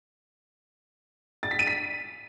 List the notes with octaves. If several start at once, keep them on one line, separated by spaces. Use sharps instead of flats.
A6
B6
D#7
B6